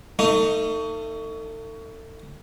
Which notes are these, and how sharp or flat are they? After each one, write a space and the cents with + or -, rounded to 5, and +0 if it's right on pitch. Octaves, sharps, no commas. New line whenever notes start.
A3 +35 D#4 +0